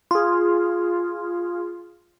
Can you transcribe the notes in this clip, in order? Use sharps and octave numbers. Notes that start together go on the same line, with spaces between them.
F4 G#4